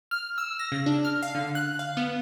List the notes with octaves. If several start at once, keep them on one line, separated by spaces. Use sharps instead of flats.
F6
E6
A#6
C#3
D4
F6
F5
D3
F#6
F5
B3